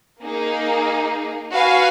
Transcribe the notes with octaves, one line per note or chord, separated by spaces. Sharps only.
A#3 D#4 G#4
F#4 B4 F5 G#5